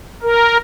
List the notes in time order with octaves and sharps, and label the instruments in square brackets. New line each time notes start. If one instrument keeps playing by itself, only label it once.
[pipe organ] A#4